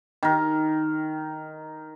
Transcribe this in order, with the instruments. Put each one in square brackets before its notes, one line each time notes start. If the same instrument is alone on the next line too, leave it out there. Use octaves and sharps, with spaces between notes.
[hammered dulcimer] D#3 A#4